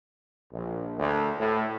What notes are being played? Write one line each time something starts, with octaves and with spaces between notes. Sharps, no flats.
A#1
D2
A2